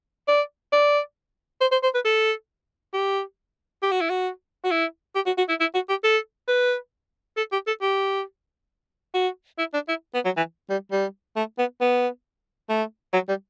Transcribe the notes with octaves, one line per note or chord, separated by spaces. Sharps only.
D5
D5
C5
C5
C5
B4
A4
G4
G4
F#4
E4
F#4
F#4
E4
G4
F#4
F#4
E4
E4
F#4
G4
A4
B4
A4
G4
A4
G4
F#4
E4
D4
E4
B3
F#3
E3
G3
G3
A3
B3
B3
A3
F#3
G3